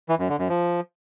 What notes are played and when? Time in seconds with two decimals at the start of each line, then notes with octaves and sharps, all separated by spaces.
0.09 E3
0.19 F#2
0.29 D3
0.39 F#2
0.49 F3